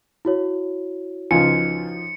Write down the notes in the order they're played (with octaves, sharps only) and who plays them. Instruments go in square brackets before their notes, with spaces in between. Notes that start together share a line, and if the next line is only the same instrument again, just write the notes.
[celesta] E4 F#4 C#5
[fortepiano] C#2 F4 G#5 [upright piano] F3 D#4 [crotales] C#7